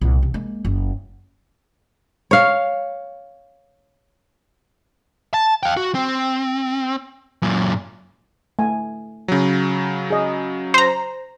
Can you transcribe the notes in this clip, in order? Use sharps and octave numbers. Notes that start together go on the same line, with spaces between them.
C2 A#2
C3
G#3 A#3
F#1
C#5 F5
A5
F5 G5
F#4
C4
F#2 A#2
A3 G#5
C#3 F#3
G#4 D#5
C5 A#5